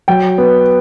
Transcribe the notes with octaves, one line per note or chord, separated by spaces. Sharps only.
F#3 G5
B3